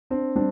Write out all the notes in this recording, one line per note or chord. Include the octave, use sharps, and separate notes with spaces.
C4 D4
G3 C4 D4